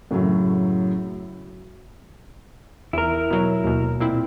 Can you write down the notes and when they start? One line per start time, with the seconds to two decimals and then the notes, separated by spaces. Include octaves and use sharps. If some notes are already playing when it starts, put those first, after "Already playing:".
0.11 F#2 A2 C#3 F#3
2.93 E2 E4 A#4
3.31 B2 F#3
3.64 D#2 B2
4.00 A#2 C4 E4